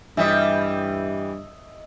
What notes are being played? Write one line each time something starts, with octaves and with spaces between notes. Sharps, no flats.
G2 E3 G3 D#5 E5